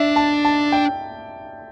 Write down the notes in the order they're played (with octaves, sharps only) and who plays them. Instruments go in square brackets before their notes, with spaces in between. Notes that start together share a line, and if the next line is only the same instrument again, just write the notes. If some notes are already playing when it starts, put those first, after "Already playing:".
Already playing: [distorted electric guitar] D4 [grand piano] D5 E5
[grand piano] A5
A5
G5